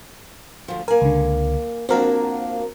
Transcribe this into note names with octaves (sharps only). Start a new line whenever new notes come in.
D2 F3
A#3 A#4 G#5
C#2 D3
F3 A#3 C4 D4 F#4 A#4